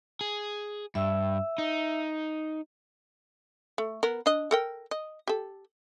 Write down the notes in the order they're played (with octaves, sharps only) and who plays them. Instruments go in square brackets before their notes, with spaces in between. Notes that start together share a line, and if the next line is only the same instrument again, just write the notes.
[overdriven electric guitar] G#4
[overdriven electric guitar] G2 [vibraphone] E5 E6
[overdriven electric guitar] D#4
[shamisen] A3
B3 A#4
D4 D#5
A4 A#4 G5
D#5
G4 A4